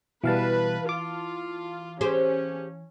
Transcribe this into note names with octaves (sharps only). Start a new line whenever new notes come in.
B2 E3 G3 B4 F5 A5
F4 D6
C#4 G4 G#4 C5